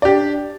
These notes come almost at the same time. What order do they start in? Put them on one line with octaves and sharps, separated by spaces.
D5 G4 D4